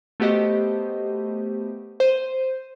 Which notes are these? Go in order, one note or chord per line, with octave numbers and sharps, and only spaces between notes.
A3 B3 F#4 G4 C5 D#5
C5 D#7